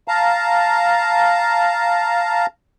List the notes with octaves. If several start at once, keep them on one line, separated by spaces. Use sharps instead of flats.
F5 A5 A#5